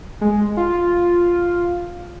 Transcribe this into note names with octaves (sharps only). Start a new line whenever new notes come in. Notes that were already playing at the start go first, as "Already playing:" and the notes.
G#3
F4